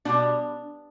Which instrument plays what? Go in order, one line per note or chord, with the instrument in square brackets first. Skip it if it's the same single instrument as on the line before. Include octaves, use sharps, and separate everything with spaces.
[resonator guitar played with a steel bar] B2 G3 D4